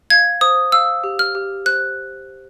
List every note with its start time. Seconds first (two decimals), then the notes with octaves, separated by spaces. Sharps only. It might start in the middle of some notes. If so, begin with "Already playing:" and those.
0.10 F5 G#6
0.41 C5 D#6
0.72 F5 E6
1.04 G4
1.19 F6
1.35 G4
1.66 C5 F#6